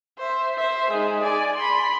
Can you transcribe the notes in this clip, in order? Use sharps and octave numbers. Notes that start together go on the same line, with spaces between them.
C5 E5
C5 E5
G#3 D#4
D5 G#5
B5 C6